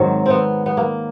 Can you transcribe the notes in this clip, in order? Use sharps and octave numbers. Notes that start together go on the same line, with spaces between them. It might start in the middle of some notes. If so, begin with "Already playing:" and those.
Already playing: G#2 D#3 F#3 C4
B3 C4
B3
A#3